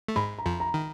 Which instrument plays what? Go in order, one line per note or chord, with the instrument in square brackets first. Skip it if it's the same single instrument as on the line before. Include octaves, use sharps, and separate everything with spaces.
[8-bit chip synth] A3
[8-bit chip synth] G#2 G#3 [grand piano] B5
[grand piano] A#5
[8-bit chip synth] F2 F3
[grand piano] A#5
[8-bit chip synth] D#3